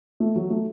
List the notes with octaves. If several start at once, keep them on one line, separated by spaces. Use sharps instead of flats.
A3
F#3
A3